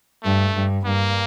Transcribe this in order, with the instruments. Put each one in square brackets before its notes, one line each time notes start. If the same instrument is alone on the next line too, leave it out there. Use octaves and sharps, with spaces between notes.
[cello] G2 [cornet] A3
[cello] G2
[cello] G2 [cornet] A#3